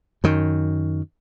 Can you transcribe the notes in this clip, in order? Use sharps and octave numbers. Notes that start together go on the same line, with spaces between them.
F#2 D#3